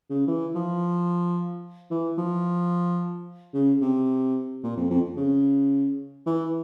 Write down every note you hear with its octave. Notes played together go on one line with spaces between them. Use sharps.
C#3
E3
F3
E3
F3
C#3
C3
A#2
F2
F2
C#3
E3